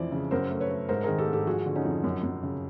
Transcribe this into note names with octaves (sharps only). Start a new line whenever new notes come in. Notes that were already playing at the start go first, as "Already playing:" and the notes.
Already playing: F2 E3 C5 D5
C#3
F#2 A#4 C5
A3
B4 C#5
A3
G#2 A#4 C5
D#3 G#4 A#4
G4 A4
G#2
G4 A4
F3 F#4 G#4
D3
C#4 D#4
F2
F#2
F#2
C#3